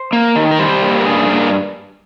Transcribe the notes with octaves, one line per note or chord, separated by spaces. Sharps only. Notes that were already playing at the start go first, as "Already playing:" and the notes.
Already playing: C5
A#3
D#3
A#4
G3 C5
A#3
A#4
G2 G#4
A#3